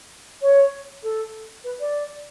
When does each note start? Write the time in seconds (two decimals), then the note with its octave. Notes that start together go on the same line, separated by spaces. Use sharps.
0.41 C#5
1.03 A4
1.64 B4
1.80 D5